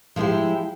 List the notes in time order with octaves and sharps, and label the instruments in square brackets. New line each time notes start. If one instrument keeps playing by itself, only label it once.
[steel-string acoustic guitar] F3 G#3 C4 E4 G4